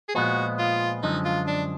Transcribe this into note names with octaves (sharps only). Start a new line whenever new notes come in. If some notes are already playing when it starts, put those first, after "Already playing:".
G#4
A#2 F3 G#3 B3 F#4
F4
F#2 D3 F3 G#3 D#4
F4
D4